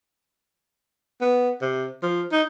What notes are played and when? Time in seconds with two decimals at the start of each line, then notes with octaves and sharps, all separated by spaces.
1.21 B3
1.62 C3
2.03 F3
2.32 D#4